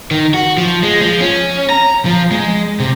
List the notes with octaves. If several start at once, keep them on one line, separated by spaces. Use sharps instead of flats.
D#3
F#4
F3
G#3
F3
C#4
A#5
F3
G#3
C3